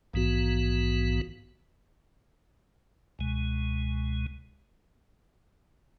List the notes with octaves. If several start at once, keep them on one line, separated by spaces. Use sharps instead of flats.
A#1 G#2 E3 B3 F#4
C#2 B2 G#3